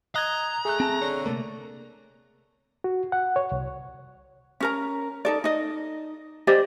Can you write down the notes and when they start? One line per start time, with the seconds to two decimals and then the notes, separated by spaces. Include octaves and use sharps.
0.16 D#5 A#5 F#6 G#6
0.65 A3 G#4 F#6
0.80 C4 A5
1.01 D3 C#5
1.26 C3 A3 A#3
2.84 F#4
3.12 F#5
3.36 C#5
3.52 C2
4.60 C#4 A#4 A#5
5.25 D#4 A4 D5
5.44 D#4 D#5
6.47 G4 C5 D5 D#5